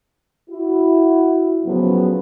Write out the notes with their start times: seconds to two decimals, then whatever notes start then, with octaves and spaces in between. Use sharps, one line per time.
0.50 E4 F#4
1.65 A2 C#3 F3 F#3 B3